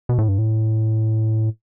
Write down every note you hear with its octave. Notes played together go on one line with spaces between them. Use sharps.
B2
A2
G2
A2